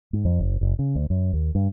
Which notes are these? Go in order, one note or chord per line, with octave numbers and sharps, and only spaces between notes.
G#2
F2
F#1
F#1
C#3
D2
F#2
D#2
G2